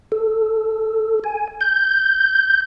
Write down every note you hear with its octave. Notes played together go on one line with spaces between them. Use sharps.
A4
G#5
G6